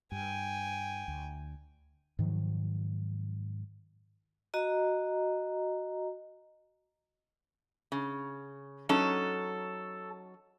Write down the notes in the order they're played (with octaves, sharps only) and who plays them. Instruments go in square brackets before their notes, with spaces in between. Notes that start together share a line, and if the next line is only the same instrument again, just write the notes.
[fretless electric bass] G2 [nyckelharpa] G5 G#5
[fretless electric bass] D2
G#2 D#3 F3 F#3
[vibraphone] F#4 D#5 A#5
[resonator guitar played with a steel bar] C#3
[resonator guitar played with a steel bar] F#3 C#4 D#4 [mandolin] A4